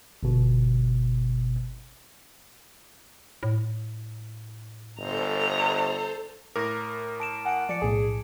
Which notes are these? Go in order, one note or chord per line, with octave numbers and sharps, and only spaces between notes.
G1 B2
A2
G1 A4 C5 A#5
A2 A#4 D6 A#6
A5 D7 E7
F#5 G#5 D7
F3 D5 C#7 D7
B1 A2 G#4